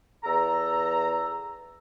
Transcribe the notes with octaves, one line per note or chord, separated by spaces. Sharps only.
E2 A4 A#5